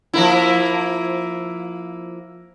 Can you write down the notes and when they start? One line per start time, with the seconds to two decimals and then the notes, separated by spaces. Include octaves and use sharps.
0.14 F3 A#3 E4